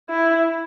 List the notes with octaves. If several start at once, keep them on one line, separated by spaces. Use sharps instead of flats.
E4